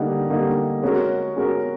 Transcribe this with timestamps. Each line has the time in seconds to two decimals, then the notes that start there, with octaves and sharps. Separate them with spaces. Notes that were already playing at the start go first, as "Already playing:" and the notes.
Already playing: D3 G3 A#3 D#4
0.29 D3 G3 A#3 D#4
0.83 G#3 C#4 F#4 A#4
1.36 G#3 C#4 F#4 A#4